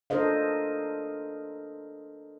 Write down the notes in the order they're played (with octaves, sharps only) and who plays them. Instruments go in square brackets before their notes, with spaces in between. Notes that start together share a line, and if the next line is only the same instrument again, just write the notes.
[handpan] D4 A4 A#4 C5 D#5 F5